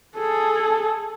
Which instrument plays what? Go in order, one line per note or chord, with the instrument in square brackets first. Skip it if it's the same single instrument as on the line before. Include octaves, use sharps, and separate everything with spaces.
[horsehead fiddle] G#4 A4